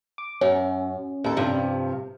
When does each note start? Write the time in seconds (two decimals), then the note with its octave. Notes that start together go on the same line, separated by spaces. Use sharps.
0.18 D6
0.41 F#2 C#4
1.24 D#2 A4
1.37 G2 C3 F3